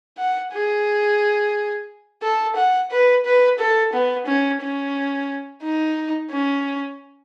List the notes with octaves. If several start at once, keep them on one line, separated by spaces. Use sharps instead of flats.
F#5
G#4
A4
F#5
B4
B4
A4
B3
C#4
C#4
D#4
C#4